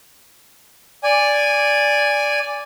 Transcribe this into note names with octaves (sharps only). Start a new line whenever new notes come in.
D5 G#5